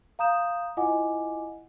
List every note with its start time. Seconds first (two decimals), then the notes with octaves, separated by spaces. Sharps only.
0.19 F5 A#5 D#6 G6 E7
0.77 E4 F4 D#5 F#5 G#5 D6